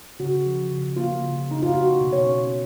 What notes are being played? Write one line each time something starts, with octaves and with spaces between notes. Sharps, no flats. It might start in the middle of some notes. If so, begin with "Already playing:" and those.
C#3 F#4
F3
C#3
A#3 F4
C#3
C#3 D#4
F4
A#3 F#4
B2
C#5
C#4